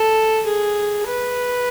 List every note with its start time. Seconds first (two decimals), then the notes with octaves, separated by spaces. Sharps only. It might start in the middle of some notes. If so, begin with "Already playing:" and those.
Already playing: A4
0.46 G#4
1.07 B4